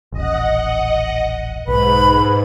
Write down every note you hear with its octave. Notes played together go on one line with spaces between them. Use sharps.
D#1 A1 D#5 F#5
B1 G#2 B4 B5